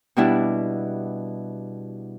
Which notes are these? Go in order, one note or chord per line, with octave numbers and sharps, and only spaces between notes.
B2 G3 D4 E4